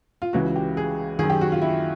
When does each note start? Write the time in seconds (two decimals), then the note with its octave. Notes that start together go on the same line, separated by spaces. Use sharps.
0.22 F4
0.33 C#2 C#3 E3 F#4
0.56 G4
0.77 G#4
1.19 F#2 D#3 G#4
1.30 G4
1.41 F#4
1.52 F4
1.62 E4